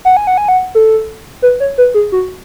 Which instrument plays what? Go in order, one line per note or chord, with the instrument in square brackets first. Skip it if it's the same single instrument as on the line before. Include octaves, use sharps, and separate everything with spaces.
[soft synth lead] F#5
G#5
F#5
G#5
F#5
A4
B4
C#5
B4
G#4
F#4